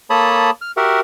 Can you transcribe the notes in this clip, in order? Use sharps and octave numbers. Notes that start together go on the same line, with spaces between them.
A#3 A4 C#5 A5 B5 D#6
F6
F#4 G4 A#4 E5 F#5